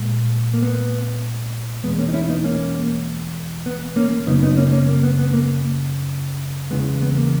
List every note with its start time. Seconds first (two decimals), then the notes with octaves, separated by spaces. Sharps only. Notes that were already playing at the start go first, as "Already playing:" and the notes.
Already playing: A#2 G#3
0.54 A#3
0.62 B3
1.84 E2 B2 G#3 B3
1.98 A#3 C#4
2.08 D#4
2.13 C#4 E4
2.29 B3 D#4
2.44 A#3 C#4
3.66 B3
3.96 A#3 C#4
4.27 F#2 C#3 F#3 B3 D#4
4.43 B3 D#4
4.57 A#3 C#4
4.73 A#3 C#4
4.88 A#3
5.03 B3
5.19 B3
5.33 A#3
6.70 E2 C#3 E3 G#3 B3
7.02 B3
7.17 A#3